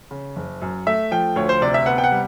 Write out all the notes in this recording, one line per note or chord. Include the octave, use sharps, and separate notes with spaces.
C#3
F#1
F#2
A3 E5
F3 G5
D2 C#5
C5
C3 D5
E5
B3 F#5
G5
F#5
G3